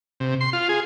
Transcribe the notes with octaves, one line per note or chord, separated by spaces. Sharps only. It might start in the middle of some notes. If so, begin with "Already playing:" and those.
C3
C6
F4
G#4